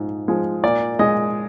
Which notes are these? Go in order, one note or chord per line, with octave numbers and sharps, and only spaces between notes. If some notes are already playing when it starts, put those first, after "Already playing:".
Already playing: G#2 F3 G#3
F3 G#3
A#2 D5
G#3 D#5